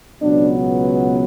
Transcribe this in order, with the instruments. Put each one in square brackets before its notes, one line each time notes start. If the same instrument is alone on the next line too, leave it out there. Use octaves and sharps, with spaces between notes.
[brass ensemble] C#2 B2 F#3 B3 D4